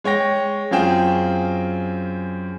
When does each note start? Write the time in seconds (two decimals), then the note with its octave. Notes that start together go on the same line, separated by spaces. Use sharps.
0.04 G#3 C#5 G5 A#6
0.71 F#2 C4 F4 G#4 G5 E7